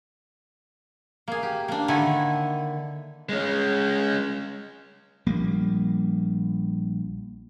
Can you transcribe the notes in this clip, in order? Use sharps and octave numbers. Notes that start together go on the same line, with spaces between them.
A#3 G#4
G4
A#3 D4
D3 D#3 E4 G#5
G#3 C#4
A#1 G3 A#3